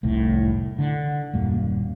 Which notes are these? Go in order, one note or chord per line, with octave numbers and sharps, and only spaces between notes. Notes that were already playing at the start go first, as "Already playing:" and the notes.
F1 C2 A2
D3
D#1 F#2 G3 A#3